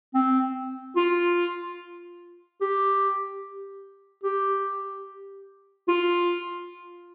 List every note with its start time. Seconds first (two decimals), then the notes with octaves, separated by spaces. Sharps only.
0.14 C4
0.96 F4
2.61 G4
4.23 G4
5.88 F4